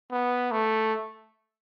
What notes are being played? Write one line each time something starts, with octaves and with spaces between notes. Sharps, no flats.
B3
A3